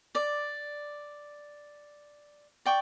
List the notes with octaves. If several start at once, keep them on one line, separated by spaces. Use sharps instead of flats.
D5 D6
D5 G5 C#6